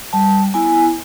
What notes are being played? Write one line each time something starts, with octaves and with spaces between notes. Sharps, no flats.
G3 A5
B3 E4 G#5